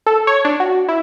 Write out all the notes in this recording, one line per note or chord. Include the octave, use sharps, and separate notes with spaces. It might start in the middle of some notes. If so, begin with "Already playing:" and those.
A4
C#5
D4
F#4
E4